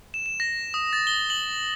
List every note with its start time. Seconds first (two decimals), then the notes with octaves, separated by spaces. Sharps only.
0.14 E7
0.26 E7
0.40 A#6
0.74 D#6
0.93 A6
1.07 G7
1.30 F#7